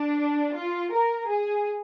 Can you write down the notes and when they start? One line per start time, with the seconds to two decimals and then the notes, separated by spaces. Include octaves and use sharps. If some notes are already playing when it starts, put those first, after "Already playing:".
Already playing: D4
0.56 F4
0.92 A#4
1.28 G#4